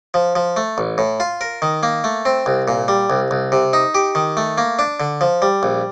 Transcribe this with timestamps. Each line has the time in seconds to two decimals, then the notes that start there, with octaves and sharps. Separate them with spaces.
0.14 F3
0.36 F3
0.57 A3
0.78 A1
0.98 A2
1.20 F4
1.41 A#4
1.62 D#3
1.83 A#3
2.04 A3
2.25 C4
2.46 C2
2.68 A#2
2.88 G3
3.10 C2
3.31 C2
3.52 C3
3.73 D#4
3.95 G4
4.15 D#3
4.37 A3
4.58 A#3
4.79 D4
5.00 D3
5.21 F3
5.42 G3
5.63 A#1